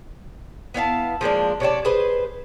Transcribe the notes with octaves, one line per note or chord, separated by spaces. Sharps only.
B3 E4 F5 A5
F3 G#3 A#3 D4
C3 C#5 D5 A5
G#4 B4 C5